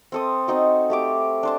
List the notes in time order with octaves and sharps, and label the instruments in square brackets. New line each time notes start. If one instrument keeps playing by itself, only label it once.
[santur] C4 A4 D#6
C4 D#4 F#4
A3 G4 D6
D4 C5 A5